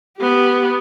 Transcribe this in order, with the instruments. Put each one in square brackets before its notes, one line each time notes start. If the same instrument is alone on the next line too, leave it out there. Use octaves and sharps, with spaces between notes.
[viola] B3 G4